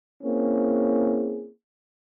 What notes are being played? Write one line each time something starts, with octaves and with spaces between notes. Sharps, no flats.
A#3 C4 C#4 E4 G#4